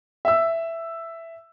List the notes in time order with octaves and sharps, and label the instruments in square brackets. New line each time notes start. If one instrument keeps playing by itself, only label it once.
[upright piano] E5 E6